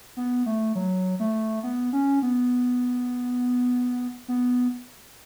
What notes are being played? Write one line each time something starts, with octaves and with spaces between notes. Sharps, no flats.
B3
A3
F#3
A3
B3
C#4
B3
B3